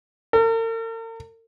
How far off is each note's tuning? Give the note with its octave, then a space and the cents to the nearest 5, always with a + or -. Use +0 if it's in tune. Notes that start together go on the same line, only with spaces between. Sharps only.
A#4 -45